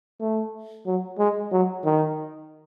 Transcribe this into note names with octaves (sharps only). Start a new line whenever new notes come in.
A3
F#3
G#3
F#3
D#3